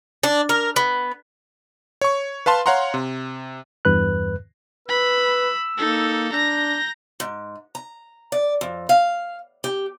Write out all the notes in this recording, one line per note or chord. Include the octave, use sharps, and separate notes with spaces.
D4
A#4
B3
C#5 C#6
B4 F5 A5 C6
C#5 F5 F#5 A#5 C6
C3
E2 G2 B4 F#6
B4 B5 E6
A#3 D#4 A4
D4 A#5 G6 A#6
G#2
A#5
D5
F2
F5
G4